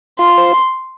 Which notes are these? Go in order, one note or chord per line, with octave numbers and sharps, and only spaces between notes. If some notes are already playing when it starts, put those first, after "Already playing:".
F4 C6
C5